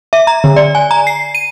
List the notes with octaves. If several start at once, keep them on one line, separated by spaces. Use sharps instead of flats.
E5
A#5
D3
D5
G#5
A#5
C7
D#7